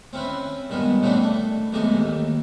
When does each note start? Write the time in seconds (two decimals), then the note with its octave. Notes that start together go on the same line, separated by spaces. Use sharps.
0.13 C4 C#4 E4 B4
0.70 G2 D#3 G#3 B3
1.02 C#3 E3 A3 B3 C4 D4
1.23 A3
1.72 B1 C3 E3 G#3 A3 D#5
1.97 D#2